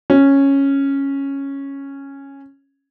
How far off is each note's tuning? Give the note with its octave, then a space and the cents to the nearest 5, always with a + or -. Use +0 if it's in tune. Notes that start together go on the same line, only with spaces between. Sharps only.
C#4 -5